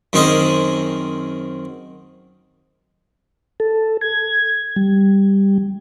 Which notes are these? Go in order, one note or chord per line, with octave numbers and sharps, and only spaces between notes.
F#2 D#3 C4 G#4 D#5
A4
G#6
G3